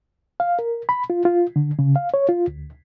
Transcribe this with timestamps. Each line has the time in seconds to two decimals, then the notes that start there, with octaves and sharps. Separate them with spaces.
0.40 F5
0.59 A#4
0.89 B5
1.10 F4
1.25 F4
1.56 D3
1.79 C#3
1.96 F5
2.14 C#5
2.29 F4
2.48 D2